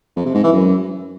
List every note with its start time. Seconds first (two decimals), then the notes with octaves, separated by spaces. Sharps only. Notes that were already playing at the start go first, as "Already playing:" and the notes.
0.16 F2
0.25 C3
0.35 G#2
0.44 E3
0.53 F#2